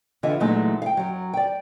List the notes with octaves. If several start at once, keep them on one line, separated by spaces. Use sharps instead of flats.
D3 E3 F4 D#5 E5 F#5
A#2 E3 F#3 G#3 A3 D#4
F5 G5
F#2 F#3
D5 G5